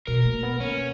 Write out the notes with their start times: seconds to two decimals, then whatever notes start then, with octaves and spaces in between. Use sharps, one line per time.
0.07 B2 A#4
0.25 A#3
0.43 B3
0.60 A#3 C#4